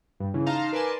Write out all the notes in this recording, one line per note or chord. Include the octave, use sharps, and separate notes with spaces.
G2
C#3 E3
D#4 F5 A5 A#5 C6
A#4 B4 D5 G#5 A5 C6